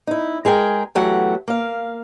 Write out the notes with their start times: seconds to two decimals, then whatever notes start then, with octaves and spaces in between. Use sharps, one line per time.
0.07 D#4 E4
0.45 G#3 G#4 A#4 G5
0.95 E2 E3 F#3 A3 G4 F#5
1.48 A#3 F5